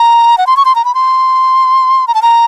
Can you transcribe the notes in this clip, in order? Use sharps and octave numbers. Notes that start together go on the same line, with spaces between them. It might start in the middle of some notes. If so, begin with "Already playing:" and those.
Already playing: A#5
F#5
C6
C#6
C6
A#5
B5
C6
A#5
A5
A#5